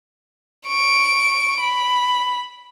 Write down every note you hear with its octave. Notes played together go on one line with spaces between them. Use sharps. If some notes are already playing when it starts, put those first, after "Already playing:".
C#6 D7
B5